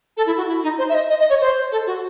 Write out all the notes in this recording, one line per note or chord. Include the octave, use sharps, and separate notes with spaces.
A4
E4
F#4
E4
D#4
C5
E5
D#5
D#5
D#5
C#5
C5
A4
F#4